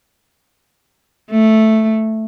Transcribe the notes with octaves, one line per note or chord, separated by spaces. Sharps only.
A3